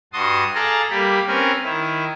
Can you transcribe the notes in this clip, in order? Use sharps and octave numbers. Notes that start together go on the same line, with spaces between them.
G2 F#4 A5 C6 D#6
G#4 A4 D5 F5 A5 A#5
G3 A#3 G4 B5
C4 C#4 A#4 B4
D#3 E4